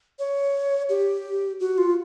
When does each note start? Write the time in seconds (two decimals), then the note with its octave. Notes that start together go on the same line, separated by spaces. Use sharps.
0.19 C#5
0.89 G4
1.60 F#4
1.78 F4